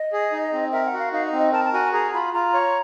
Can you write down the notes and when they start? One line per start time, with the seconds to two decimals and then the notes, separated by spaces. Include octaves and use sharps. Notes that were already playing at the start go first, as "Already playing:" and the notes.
Already playing: D#5
0.13 G#4
0.32 D#4
0.53 C4
0.72 A#4 E5
0.86 F#5
0.93 F#4
0.99 F5
1.12 D#4 F5
1.26 D#5
1.32 C4
1.39 D#5
1.53 A#4 A5
1.65 A5
1.73 F#4 G#5
1.93 G#4 A#5
2.14 F4 B5
2.33 F4 A#5
2.54 C#5